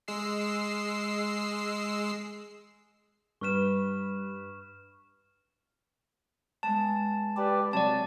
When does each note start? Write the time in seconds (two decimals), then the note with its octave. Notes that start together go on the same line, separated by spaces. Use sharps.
0.08 G#3 E6 C7
3.41 G2 B4 C#6 F6 E7
6.63 G#3 B3 A5
7.37 G4 B4 D5 A5
7.73 C3 F#3 D5 A5